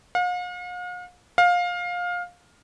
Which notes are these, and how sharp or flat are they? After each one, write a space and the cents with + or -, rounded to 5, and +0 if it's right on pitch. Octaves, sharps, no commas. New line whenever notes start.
F5 +45
F5 +20